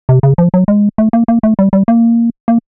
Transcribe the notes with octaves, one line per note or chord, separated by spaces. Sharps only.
C3
C#3
F3
F#3
G#3
A3
A#3
A#3
A3
G3
G3
A#3
A#3